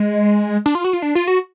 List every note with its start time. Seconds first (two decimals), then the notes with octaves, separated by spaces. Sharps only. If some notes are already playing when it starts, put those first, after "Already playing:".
Already playing: G#3
0.66 D4
0.75 F4
0.84 F#4
0.93 F4
1.02 D4
1.15 F4
1.27 F#4